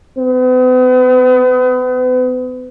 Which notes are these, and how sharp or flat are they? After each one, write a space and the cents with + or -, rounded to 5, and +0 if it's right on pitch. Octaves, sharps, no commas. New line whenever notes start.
B3 +40